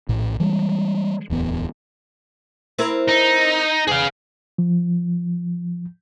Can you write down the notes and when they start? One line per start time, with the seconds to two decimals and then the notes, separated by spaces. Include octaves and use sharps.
0.09 A#1 A2
0.40 E3 G3 G#3
1.30 D1 E2 B3
2.79 C4 E4 A#4
3.08 D#4
3.88 E2 G#4 F5
4.58 F3